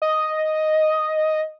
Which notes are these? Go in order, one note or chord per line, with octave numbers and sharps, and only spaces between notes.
D#5